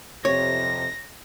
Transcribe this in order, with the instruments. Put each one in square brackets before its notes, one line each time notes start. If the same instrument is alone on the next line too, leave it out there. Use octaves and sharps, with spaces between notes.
[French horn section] F2 C3 [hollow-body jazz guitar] C#5 [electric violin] A#6